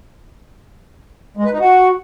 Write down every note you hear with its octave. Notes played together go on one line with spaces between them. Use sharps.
G#3
B4
D#4
F#4